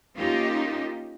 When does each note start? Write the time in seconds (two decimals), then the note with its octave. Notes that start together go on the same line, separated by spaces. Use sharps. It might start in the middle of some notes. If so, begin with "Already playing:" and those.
0.15 A#3 C#4 D#4 F4 G4